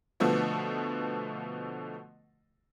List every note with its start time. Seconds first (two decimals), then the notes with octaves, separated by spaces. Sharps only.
0.20 B2 D3 F3 A3 B3